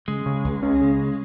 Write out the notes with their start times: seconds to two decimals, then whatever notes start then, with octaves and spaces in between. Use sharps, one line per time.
0.08 C#3 G#3
0.26 C#3
0.44 C#2
0.63 C#4
0.81 C#3